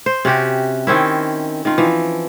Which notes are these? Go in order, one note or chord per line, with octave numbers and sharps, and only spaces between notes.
C5
C3 C#4 F#4 G4
D#3 C4 C#4 E4
D#3 F4
E3 F3